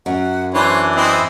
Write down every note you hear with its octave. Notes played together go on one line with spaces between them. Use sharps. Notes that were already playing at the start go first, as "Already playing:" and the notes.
F#2 F#5
E3 D4 C5 C#5
C4 E4 D#5